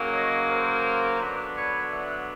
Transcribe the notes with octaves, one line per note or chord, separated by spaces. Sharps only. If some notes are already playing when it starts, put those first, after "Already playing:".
Already playing: C#3 F#3 A#3
C#5 D#5
A#4 C5
D3 F#3 B3 D4
B4 C#5
E5 F#5